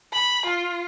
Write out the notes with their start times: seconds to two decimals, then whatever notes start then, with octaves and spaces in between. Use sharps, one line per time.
0.13 B5
0.46 F4